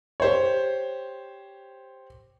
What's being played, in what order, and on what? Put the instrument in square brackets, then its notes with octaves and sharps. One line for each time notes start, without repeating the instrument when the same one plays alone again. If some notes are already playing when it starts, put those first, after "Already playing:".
[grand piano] G4 C5 C#5